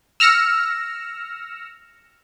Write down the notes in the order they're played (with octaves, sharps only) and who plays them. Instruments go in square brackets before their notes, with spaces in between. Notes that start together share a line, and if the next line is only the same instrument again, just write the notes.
[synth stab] E6 F6 A#6 C#7 E7